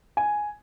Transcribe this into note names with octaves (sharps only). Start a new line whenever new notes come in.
G#5